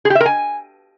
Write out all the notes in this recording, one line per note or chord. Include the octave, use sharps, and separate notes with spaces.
G#4
G4
E5
A#4
G#5